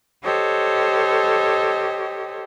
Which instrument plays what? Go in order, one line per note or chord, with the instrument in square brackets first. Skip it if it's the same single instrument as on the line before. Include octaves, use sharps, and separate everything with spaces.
[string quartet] G4 A4 C5 C#5 D#5